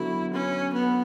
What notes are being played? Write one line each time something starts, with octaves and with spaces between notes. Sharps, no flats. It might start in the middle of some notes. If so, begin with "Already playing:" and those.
Already playing: D3 F#3 B3 E4 F#4 A4
C#4
B3